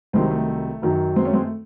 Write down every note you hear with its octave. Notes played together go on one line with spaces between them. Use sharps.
C2 C3 D#3 F#3 G#3 C4
A3
F#2 D#3 F#3
G#3 C4
A3 C#4
G#3 C4
A3